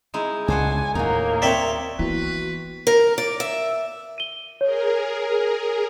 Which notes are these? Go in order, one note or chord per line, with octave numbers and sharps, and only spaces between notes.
G#3 D#4 E4
C#2 D4 C5 F#5 G#5
D#2 A2 A#3 D#4 F#4
C4 C#5 D5 E5 G5
E3 A#3 B3 E4 F#4 B4
A#4
D5
E5
D#7 G7
G#4 A#4 C#5